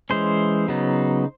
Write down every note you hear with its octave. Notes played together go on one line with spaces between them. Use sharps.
E3 G#3 C#4 C5
C#3 F#3 B3 D#4